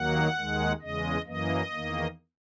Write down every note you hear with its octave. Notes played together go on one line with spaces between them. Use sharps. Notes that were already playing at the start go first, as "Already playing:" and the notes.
Already playing: D#2 D#3 F#3 A#3 F#5
D#2 D#3 G#3
E2 C#3 G#3 D#5
F#2 E3 A#3 D#5
E2 D#3 A#3